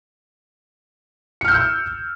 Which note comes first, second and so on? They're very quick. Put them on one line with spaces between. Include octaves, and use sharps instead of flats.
C#7 F6 G6 E6